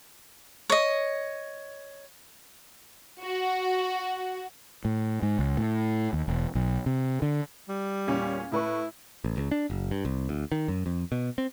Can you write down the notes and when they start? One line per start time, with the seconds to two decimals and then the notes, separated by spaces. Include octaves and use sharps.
0.70 C#5 D#5
3.23 F#4
4.85 A2
5.22 G#2
5.39 C#2
5.57 A2
6.13 D#2
6.28 E1
6.55 B1
6.86 C3
7.22 D3
7.69 G3
8.07 E2 A#2 C#4
8.52 A2 E4 B4 C#6
9.24 A1
9.37 C#2
9.51 D4
9.70 F#1
9.91 G2
10.05 C2
10.29 D2
10.52 D#3
10.68 F#2
10.86 F2
11.12 B2
11.38 C4